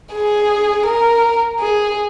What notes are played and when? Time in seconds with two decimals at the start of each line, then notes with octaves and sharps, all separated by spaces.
0.13 G#4
0.86 A#4
1.60 G#4